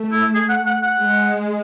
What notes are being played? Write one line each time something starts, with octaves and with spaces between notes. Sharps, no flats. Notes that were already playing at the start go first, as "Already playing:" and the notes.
Already playing: A3
E4
G#4
F#5
F#5
F#5
G#3